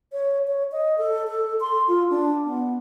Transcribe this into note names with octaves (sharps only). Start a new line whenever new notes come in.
C#5
C#5
D#5
A4
A4
C6
F4
D4
B3